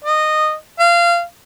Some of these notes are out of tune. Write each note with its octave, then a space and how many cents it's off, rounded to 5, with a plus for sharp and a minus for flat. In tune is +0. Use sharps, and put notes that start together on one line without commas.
D#5 -15
F5 -20